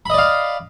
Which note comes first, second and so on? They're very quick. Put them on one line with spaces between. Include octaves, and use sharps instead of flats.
B5 D#5 D5 F5